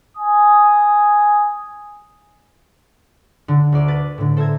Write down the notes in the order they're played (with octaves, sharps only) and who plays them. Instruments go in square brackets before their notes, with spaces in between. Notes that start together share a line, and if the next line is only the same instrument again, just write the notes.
[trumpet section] G#5 D#6
[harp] D3
D2 D5
B4 A6 D#7
A2 D3
A4 C5 E5 A#5 G#6